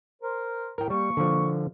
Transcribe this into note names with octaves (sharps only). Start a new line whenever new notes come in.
A#4 C5
A2 A#4 G5
G3 A#3 C#6
D3 F3